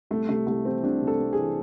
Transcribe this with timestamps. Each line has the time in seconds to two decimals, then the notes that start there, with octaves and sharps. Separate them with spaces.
0.11 C2 A3
0.29 C3 A3
0.47 C2 A3
0.65 E3 C4
0.83 C2 D4
1.01 C3
1.07 A4
1.20 C2
1.33 G#4
1.38 E3